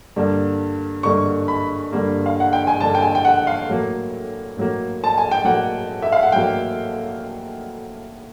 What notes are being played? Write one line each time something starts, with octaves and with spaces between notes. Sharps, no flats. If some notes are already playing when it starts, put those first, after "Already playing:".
G2 D3 G3 A#3
G2 D3 G3 A#3 C#6
B5
G2 D3 G3 A#3
F5
F#5
G5
G#5
G2 D3 G3 A#3 A5
G5
G#5
G5
F#5
F5
A2 F#3 A#3
A2 F#3 A#3
A5
G#5
G5
A2 F#3 A#3 F#5
E5
F5
F#5
A2 F#3 A#3 G5